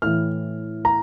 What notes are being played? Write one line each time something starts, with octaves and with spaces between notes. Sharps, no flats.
A2 E3 F6
A#5